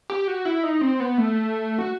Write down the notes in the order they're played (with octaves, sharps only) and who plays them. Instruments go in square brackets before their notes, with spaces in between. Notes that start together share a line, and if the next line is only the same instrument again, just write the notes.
[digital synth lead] G4
F#4
E4
D#4
C4
B3
A3
F#4